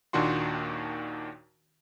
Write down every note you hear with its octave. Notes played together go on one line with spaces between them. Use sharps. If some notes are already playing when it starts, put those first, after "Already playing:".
D#2 A#2 D#3 D4 F#4 C6